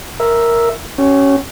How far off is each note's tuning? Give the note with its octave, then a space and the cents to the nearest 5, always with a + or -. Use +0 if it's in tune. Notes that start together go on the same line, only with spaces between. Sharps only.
A#4 +0 E5 +0
C#4 +0 G4 -45